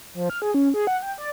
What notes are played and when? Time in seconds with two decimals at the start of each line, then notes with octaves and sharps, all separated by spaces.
0.14 F3
0.30 F6
0.42 G#4
0.54 C#4
0.74 G#4
0.87 F#5
1.02 G5
1.18 D5